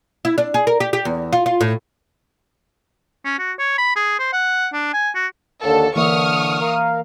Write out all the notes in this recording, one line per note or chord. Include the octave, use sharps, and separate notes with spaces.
E4
D4
G#4
A#4
G4
G4
E2
F4
F4
A2
C#4
F#4
C#5
B5
G#4
C5
F#5
D4
G#5
F#4
D#2 D3 A4 C#5 F5
D3 E3 A#3 E5 C#6 D#6 F6
A#4 F5